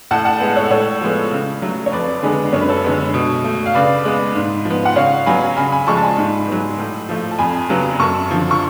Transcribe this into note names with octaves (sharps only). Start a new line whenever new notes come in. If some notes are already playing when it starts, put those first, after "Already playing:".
A2 F#5 A5
F#5 A5
G#3 B3
A4 C#5
A2 A4 C#5
F3 G#3 B3
C#3
F#3 A3
C#5
F2 B4 D5
D3 G#3 B3 G#4 B4
F#2 C#5
B4
A4 C#5
D3 G#3 B3
B2
A3
F5
C#3 B4 D5
G#3 B3
G#2
F3
B3
F#5
C#3 C#5 F5
F#3 B3 G#5 B5
C#3 G#5 B5
G#5 B5
F3 G#3 A5 C#6
A5
G#5 B5
G#2
F#3 B3
A2
F3 A3
A5
F2 G#5 B5
C#3 F#3 B3
F#2 A5 C#6
D3 F3
C#6